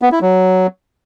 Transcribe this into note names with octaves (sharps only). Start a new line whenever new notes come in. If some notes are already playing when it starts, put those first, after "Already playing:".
B3
E4
F#3